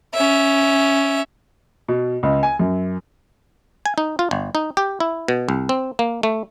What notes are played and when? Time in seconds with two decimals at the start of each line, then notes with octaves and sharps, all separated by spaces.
0.14 C#4 E5
1.88 B2
2.23 C#2
2.43 G#5
2.59 F#2
3.86 G#5
3.98 D#4
4.19 F4
4.31 G1
4.55 D#4
4.77 G4
5.00 E4
5.28 B2
5.49 C2
5.69 C4
5.99 A#3
6.23 A3